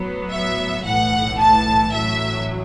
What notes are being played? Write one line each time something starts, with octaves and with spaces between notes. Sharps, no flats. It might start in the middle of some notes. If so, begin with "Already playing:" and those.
Already playing: A2 F#3 B3
E5
B1 A2 E3 F#5
A5
A1 A2 F#3 E5